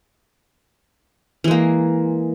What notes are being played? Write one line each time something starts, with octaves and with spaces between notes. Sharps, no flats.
E3 G#3 A#3